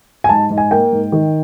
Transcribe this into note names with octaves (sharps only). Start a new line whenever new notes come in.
G#5
G#2 A5
G#2
G#5
A#3 G5
G#2
D#3